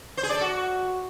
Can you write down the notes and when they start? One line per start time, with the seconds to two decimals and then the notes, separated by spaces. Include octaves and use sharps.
0.17 C5
0.23 G#4
0.29 D5
0.35 A4
0.41 F#4